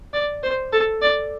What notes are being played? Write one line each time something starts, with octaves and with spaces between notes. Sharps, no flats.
D5
C5
A4
D5